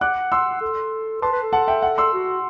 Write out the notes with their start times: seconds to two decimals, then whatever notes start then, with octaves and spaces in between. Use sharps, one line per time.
0.01 F#5 D6 F#6
0.32 C6 E6
0.61 A4
1.22 B4 A5 C6
1.32 B4
1.43 A4
1.53 F#5 A5
1.68 E5 G5
1.83 F#5
1.98 C6 E6
2.14 F#4